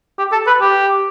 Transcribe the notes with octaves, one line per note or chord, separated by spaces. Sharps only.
G4
A4
B4
G4